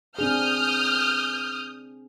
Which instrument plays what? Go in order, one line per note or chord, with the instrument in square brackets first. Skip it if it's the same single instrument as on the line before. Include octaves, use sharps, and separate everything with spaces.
[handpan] C4 D4 G#4 [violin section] D#6 F6 G6